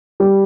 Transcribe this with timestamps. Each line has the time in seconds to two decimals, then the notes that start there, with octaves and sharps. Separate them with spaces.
0.20 G3